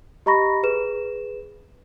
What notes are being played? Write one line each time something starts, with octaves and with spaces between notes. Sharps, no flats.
G4 D#5 A#5 B5 C#6 A#6
G#4 B4 E7